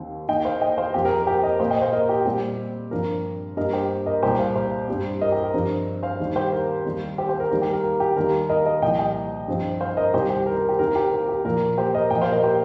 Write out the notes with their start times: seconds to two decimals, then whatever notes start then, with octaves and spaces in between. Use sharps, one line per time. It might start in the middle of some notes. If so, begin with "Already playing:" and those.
Already playing: D#2 D#3 C4
0.28 D#2 D#3 A#3 D#5 G5
0.45 C5 F5
0.61 D#5 G5
0.78 C5 F5
0.94 F2 F3 A#3 G4
1.05 A#4
1.16 A#4
1.27 G4 C5
1.43 A#4 D#5
1.60 A#2 A#3 C5 F5
1.70 D#5 G5
1.82 C5 F5
1.93 A#4 D#5
2.09 G4
2.25 A#2 G3 C4 G4
2.91 G2 F3 C4 A#4
3.57 G2 G3 A#3 A#4 D#5
3.73 G4 C5
4.06 A#4 D#5
4.23 C2 A#2 G3 G4 C5
4.39 C5 F5
4.56 C5 F5
4.88 G2 G3 C4
5.21 A#4 D#5
5.32 G4
5.43 A#4
5.54 G2 F3 C4
6.03 C5 F5
6.20 D#2 D#3 G3
6.36 G4 C5
6.52 A#4
6.85 D#2 D#3 G3 C4
7.18 G4 C5
7.29 G4 C5
7.40 A#4
7.51 D#2 D#3 G3 A#4
7.62 G4
7.73 A#4
7.83 A#4
8.00 G4
8.17 D#2 D#3 G3 A#4
8.49 A#4 D#5
8.66 A#4 D#5
8.82 C2 A#2 F3 D#5 G5
8.99 D#5 G5
9.48 G2 F3 C4
9.81 C5 F5
9.97 A#4 D#5
10.14 C2 C3 D#3 G3 G4 C5
10.30 G4
10.46 A#4
10.57 A#4
10.69 G4
10.79 D#2 D#3 C4 A#4
10.95 G4
11.12 A#4
11.28 G4
11.45 A#2 F3 A#3 A#4
11.78 G4 C5
11.94 A#4 D#5
12.10 A#2 F3 A#3 D#5 G5
12.21 C5 F5
12.32 A#4 D#5
12.43 G4 C5